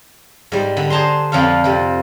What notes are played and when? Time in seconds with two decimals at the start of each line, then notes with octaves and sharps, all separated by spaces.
0.52 G#2 G3
0.77 D3 B5
0.90 G#4 C5 A5 A#5 C6
1.32 F2 F3 D4 A4 F5
1.64 C3 F3